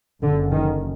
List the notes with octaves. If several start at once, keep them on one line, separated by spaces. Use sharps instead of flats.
F#1 F#2 D3
D#3